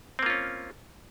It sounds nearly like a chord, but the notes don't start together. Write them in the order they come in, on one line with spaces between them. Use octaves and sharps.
C4 A#3 F4 C#4